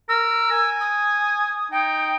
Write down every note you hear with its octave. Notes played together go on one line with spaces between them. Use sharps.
A#4 E6
G#5
D#6
D#4 G5